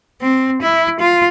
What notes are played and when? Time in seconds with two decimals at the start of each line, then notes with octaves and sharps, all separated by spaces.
0.21 C4
0.62 E4
1.00 F4